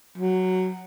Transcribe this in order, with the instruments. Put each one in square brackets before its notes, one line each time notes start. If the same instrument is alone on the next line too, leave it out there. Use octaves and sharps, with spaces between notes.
[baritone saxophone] F#3